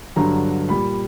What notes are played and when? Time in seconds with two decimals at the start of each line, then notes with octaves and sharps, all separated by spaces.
0.16 G2 D3 F#3 A#5
0.69 A#2 G3 B5